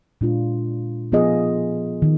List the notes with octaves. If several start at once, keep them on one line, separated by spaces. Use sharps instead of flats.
A#2 G#3 D4 F4
F3 B3 F4 G#4 D#5
D#3